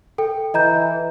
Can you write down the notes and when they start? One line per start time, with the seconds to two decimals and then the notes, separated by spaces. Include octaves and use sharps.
0.18 A4 G5
0.54 E3 D#5 A#5 G6